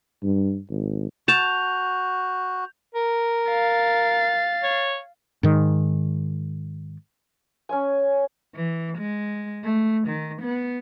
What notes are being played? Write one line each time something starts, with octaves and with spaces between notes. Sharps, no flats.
G2
G#1
F#4 A5 G6 F7
A#4
F5 A6
C#5
G#2 D#3
C#4 C#5 G#5
E3
G#3
A3
D#3
B3